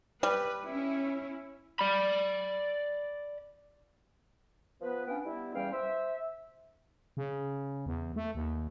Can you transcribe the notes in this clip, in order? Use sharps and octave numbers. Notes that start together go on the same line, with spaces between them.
G3 B4
C#4 E4
D5 B5
F3 B3 B4
B3 C#4 D4 F5 G5
G3 B3 E4
E2 G3 C#4 F5 G5
C5 E5
C#3
E2
A3
D#2